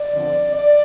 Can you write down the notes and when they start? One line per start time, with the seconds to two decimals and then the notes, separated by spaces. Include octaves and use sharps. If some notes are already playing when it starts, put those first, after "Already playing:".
Already playing: D5
0.11 D3 F3 C4
0.54 D5